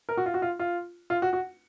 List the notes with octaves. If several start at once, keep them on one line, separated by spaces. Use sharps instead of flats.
A#4
F#4
F4
F#4
F4
F4
F4
F#4
F#4